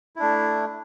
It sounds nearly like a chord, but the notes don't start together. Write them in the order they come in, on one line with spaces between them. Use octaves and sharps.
E4 D4 A3